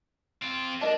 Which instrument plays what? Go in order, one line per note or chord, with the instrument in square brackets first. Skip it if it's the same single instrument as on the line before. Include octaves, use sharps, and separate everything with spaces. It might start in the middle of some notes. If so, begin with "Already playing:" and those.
[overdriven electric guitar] C4 F4
[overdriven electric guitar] D4 [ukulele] A#4 D#5 A5